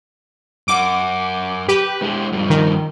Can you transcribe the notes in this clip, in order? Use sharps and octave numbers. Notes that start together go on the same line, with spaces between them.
F#2 F#5 D6
G4 B4
G#3 E4
G2 F3
D#3